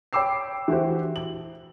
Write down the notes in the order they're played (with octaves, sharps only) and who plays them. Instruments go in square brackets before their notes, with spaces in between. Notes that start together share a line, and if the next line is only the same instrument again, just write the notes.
[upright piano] C#5 G5 B5 D6 E6 C7
E3 F#4 G4 C5
F#7